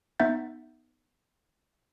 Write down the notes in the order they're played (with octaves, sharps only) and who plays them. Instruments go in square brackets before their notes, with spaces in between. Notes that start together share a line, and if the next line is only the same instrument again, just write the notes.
[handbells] B3 D#4 E5 F#5 G6 A6